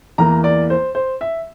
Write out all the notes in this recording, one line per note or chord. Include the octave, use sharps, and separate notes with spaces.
E2 E3 A#3 A#5
D5
C5
C5
E5